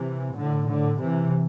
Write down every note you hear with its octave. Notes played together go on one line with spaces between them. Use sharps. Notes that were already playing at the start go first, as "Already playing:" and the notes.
Already playing: C3 E3
A2 D3
A2 D3
C3 E3